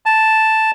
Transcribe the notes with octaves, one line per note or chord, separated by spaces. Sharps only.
A5